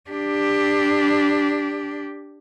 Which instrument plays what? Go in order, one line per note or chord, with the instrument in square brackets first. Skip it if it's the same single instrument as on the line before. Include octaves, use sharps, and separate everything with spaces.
[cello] D4 G4